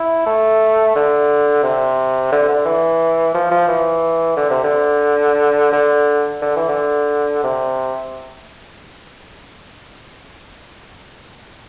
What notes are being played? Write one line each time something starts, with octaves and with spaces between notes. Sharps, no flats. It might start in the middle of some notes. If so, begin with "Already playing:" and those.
Already playing: E4
A3
D3
C3
D3
D3
E3
F3
F3
E3
D3
C3
D3
D3
D3
E3
D3
C3